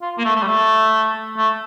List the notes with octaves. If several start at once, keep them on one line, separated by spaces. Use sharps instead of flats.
F4
A#3
A3
A3
G3
A3
A3